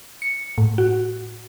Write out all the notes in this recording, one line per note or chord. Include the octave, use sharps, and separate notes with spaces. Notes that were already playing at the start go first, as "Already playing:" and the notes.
C#7
A2
F#4